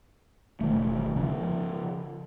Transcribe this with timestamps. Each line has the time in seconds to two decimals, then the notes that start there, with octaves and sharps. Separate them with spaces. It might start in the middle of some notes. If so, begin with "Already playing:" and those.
0.61 E1 D#3 A3
1.16 C#3 F3